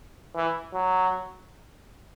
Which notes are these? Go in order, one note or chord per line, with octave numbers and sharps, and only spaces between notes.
E3
F#3